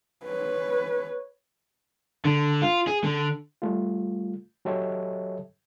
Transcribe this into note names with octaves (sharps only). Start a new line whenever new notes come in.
B4 C#5
D3
F4
G#4
D3
G3 A3 F4
F#3 G4 A4 C#5 D#5 E5